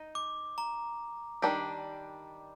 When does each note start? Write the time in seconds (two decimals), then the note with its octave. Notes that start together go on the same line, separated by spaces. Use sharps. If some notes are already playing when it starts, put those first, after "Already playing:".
Already playing: D#4
0.15 D6
0.58 A#5
1.42 D#3 G3 D4 G4